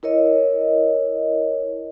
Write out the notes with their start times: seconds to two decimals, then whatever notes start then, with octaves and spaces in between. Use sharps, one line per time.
0.03 E4 A#4 C#5 D#5